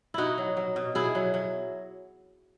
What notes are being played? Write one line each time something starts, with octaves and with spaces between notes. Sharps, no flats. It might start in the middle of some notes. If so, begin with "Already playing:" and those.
B2 D#4 E4 F#4
F#3
F#3
B2
B2 E4 G#4
F#3
F#3